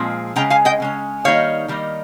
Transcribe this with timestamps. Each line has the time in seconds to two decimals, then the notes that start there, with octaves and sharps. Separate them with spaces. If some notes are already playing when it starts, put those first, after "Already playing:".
Already playing: A#2 F3 G#3 C4
0.36 C#3 G#3 C#4 G5 A#5
0.50 F5 G#5
0.65 D#5 G5
0.80 C#3 G#3 C#4
1.24 D#3 G3 A#3 D#4 C#5 F5
1.68 D#3 G3 A#3 D#4